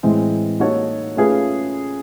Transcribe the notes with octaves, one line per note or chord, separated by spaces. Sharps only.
A2 E3 G#3 C4
A#3 D#4 F#4 A4 C#5
A3 C#4 F4 G#4 B4